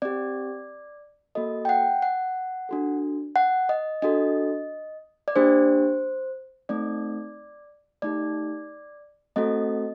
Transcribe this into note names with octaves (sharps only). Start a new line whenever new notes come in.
C4 G4 D5
A#3 F#4 A4 D#5
G5
F#5
F#5
D4 F#4 A4
F#5
D#5
D4 F#4 A4 D#5
D5
A#3 D4 G4 C5
A3 C4 D#4 D5
A3 D#4 G4 D5
A3 C4 F#4 A4 D#5